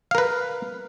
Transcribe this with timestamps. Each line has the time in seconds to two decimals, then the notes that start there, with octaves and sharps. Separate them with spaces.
0.11 F5
0.15 A#4
0.18 B4